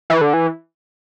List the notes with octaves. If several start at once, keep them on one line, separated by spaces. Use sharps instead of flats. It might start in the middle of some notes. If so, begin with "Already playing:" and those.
E3
D3
E3